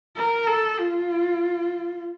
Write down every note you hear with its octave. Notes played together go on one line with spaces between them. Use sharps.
A#4
A4
F4